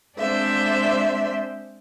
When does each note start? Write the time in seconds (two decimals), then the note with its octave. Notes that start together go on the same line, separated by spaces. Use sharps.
0.18 G#3 C4 D4 C5 D5 E5